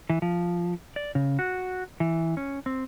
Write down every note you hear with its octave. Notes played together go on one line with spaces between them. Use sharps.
E3
F3
D5
C#3
F#4
E3
C#4
C4